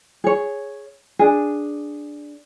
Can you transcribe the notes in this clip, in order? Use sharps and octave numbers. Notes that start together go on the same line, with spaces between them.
G#4 C#5
D4 G#4